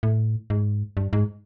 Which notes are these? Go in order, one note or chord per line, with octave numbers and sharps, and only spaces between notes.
A2
G#2
G2
G#2